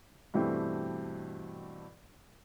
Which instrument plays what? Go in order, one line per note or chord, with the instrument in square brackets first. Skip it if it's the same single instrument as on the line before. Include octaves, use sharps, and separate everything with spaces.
[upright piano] G2 B2 E3 G3 A3 C4